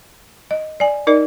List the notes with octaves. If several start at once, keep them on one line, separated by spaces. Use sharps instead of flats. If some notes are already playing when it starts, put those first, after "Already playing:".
D#5
D5 G#5
D#4 A#4 D5 D#5